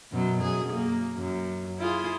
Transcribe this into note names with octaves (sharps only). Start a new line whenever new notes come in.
F#2 B2 F#3
F#2 G#4
A#3
F#2
E4 F4 G#4